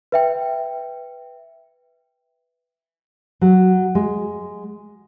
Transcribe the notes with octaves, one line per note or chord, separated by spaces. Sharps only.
B4 E5 G5
F#3
G#3